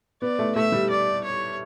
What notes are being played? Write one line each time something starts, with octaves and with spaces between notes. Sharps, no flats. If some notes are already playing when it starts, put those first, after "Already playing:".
B3 D5
A3
A3 E5
G3
D5
C#5